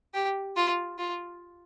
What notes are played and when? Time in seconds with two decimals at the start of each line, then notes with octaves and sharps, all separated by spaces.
0.14 G4
0.56 F4
0.98 F4